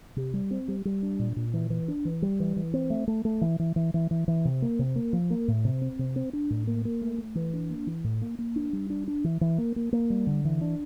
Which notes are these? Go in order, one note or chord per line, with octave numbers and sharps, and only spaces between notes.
C3
G3
C4
G3
G3
D4
A#2
A#2
E3
E3
D4
E3
G3
E3
E3
C4
A3
A3
A3
E3
E3
E3
E3
E3
E3
C3
A#3
C3
A#3
F3
A#3
A2
C3
C4
C3
C4
D4
A2
A#3
A#3
A3
A3
E3
D4
A#3
E3
A2
A#3
A#3
D4
G3
D4
D4
E3
E3
A#3
A#3
A#3
G3
D3
E3
D4